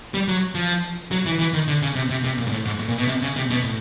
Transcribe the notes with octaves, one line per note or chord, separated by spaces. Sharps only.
G3
F#3
F3
F#3
E3
E3
D#3
D3
C#3
C3
C3
C3
A#2
G#2
A2
G#2
A2
A#2
B2
C3
C#3
C3
B2
A2